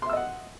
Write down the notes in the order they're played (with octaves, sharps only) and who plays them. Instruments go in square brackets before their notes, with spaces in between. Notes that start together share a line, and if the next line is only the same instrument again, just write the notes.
[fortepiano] C6
E5
E6
D#5
F#5